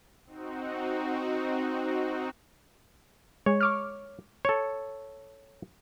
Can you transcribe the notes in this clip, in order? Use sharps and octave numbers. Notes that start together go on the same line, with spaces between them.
C4 D#4 F#4
G#3 C#5
C#6 D6 F6
A4 C#5